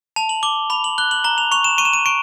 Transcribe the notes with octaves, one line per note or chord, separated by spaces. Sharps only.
A5 F7
F#7
D6 G7
B5 F7
F#7
F#6 G7
F#7
A#5 G7
F7
C#6 F7
E7
C#6 D#7
E7
D#7
C#6 D7